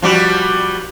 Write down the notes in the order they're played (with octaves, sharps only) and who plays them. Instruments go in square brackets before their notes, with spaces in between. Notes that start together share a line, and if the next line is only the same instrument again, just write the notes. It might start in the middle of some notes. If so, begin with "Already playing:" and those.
[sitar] F3 G3 F#4